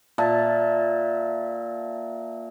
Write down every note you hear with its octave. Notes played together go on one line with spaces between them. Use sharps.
A#2 E5 A5